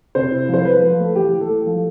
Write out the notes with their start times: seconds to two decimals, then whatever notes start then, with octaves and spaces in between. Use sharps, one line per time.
0.15 C3 C5
0.31 E4
0.49 F3 C5
0.65 F3 B4
0.83 F3
0.99 A3
1.16 E3 G4
1.33 E3
1.41 A4
1.49 A3
1.66 F3